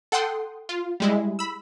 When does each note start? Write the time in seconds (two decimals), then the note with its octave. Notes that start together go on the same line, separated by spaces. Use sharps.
0.12 A4 F#5 G5 C6 D#6
0.69 F4
1.00 G3 G#3 E4
1.39 B5 E6